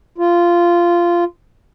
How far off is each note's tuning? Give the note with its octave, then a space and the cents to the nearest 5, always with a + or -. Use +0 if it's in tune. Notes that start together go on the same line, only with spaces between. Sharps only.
F4 -15